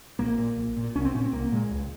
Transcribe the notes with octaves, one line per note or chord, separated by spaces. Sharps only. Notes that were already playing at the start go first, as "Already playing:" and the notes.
A#1 A#3
A#2
A#1
A#2
C2 C#4
C4
A#2 C#4
C4
C2 A#3
A#2 G#3
C#2